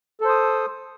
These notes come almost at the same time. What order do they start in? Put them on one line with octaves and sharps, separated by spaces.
A4 C5 D#6